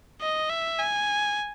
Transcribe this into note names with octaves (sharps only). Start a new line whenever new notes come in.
D#5
E5
G#5